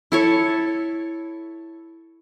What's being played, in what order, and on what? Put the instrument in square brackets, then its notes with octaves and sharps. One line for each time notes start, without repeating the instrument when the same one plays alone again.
[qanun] E4 A4 C#5